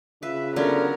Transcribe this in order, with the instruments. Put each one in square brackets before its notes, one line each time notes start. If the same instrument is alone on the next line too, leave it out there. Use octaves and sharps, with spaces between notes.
[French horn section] C#3 F4 [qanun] B4 [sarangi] E5
[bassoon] D3 [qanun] F#3 B3 C#4 [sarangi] A#4